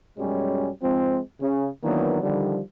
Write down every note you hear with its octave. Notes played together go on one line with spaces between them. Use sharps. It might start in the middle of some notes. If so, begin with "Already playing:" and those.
B1 F#2 G3 G#3 C#4
G#2 F3 G#3 C4
C#3
D#3 E3 F#3 A#3 B3 D4
D3 D#3 F3 G3